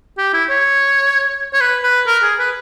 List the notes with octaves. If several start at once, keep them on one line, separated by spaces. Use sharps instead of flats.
G4
E4
C#5
C#5
B4
B4
A#4
G#4
B4